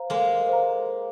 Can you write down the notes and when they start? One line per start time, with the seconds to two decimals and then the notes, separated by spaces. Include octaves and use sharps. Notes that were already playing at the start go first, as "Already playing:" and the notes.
Already playing: C5 F5 A#5
0.10 G#3 A#3 A4
0.49 C5 F5 A#5